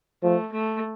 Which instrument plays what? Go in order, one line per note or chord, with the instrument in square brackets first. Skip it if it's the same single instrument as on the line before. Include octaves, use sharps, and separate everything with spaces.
[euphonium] F3 [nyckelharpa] A3
[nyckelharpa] A3